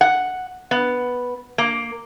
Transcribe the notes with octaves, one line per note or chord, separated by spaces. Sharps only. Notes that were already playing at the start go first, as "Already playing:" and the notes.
F#5
B3
A#3